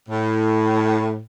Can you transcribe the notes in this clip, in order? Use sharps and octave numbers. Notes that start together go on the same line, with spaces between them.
A2